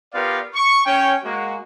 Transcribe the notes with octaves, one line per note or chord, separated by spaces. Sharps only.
B3 F4 G4 A#4 D5 F5
C#6
C#4 C#5 G5
G#3 A#3 F#4